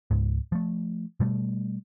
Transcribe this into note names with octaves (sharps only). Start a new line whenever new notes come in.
C#2 G#2
F3 A3
B2 G3 A3